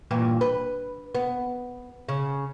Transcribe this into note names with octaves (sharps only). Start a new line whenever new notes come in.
G2 A#2 E3
B4
B3
C#3